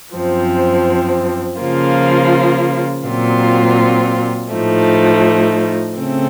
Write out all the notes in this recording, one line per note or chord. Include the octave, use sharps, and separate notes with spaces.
F#2 F3 C4
C#3 F3 A#3 F4
A#2 F#3 C4 F4
A2 F3 A3 D#4
C#3 A3 C4